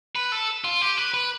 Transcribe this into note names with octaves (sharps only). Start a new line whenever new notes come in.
B4
A4
F4
G4
B4
B4